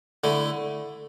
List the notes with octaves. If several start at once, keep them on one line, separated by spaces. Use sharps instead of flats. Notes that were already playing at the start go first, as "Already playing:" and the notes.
D3 A3 E4